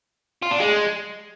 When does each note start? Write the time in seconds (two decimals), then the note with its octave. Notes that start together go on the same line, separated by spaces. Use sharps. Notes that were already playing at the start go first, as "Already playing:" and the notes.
0.43 F4
0.51 D4
0.60 G#3